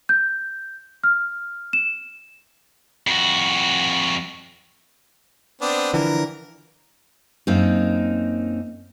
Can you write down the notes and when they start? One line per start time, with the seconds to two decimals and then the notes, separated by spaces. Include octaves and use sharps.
0.09 G6
1.04 F6
1.73 E7
3.07 F2 F#4
5.61 B3 C4 D4
5.94 D3 E3 F3 A#4
7.47 F#2 A#3 C4 D#4